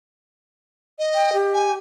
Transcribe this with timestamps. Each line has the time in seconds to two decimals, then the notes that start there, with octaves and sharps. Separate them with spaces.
0.99 D#5
1.15 G5
1.33 G4
1.54 G#5